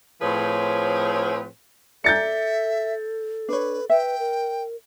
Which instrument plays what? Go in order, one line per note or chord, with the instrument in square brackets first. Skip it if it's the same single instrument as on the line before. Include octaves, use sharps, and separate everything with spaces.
[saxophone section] A2 F3 C4 G#4 B4 C#5
[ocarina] A4 [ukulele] D5 [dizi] E5 [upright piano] G6 A6 C#7
[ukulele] D4 C#5 [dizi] B4
[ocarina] B4 [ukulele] E5 [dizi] G5
[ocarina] A#4